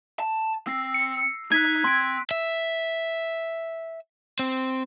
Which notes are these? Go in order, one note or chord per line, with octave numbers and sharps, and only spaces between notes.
A5
C4 E6 A#6 C7
C#7
D#4 F#6 G#6 B6 D#7
C4 C6 B6 D7
E5
C4